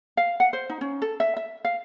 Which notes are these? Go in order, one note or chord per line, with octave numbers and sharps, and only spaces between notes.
F5
F#5
C5
D#4
C#4
A4
E5
E5
F5